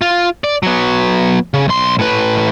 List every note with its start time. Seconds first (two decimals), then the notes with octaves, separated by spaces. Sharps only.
0.01 F4
0.44 D5
0.63 F#3 B3
1.54 C#3
1.68 B1 C6
1.99 A2 B4